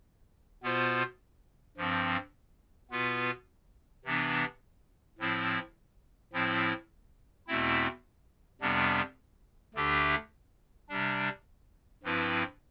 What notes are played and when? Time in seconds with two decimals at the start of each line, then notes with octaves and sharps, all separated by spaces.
0.63 B2 B3 F4 C5
1.77 G2 F3 C4
2.91 B2 B3 F4 B4
4.05 C3 E3 B3 D4
5.18 A2 F3 C4 E4
6.33 A2 F3 C4 E4
7.47 E2 B2 A3 C4 E4
8.61 F2 C3 G3 B3 D4
9.75 D2 D3 A3 D4 G4
10.89 C3 G3 D4
12.04 G2 F3 C4 E4 B4